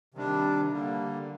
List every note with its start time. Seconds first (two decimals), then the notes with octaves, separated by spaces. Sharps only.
0.14 C3 D#3 G3 D4
0.72 D3 G3 A#3